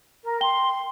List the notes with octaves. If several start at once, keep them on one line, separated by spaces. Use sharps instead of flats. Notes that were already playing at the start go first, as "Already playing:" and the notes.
A#4
G5 C6 G7